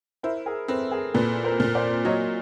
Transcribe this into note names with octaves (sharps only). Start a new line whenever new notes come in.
E4 A#4 C5
G#4 A#4
C4 A4 B4
G#4 A#4
A#2 A4 B4
A#4 C5
A#2
C5 D5
F#3 C#5 D#5